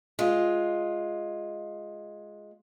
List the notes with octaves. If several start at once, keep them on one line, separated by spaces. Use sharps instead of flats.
G#3 F4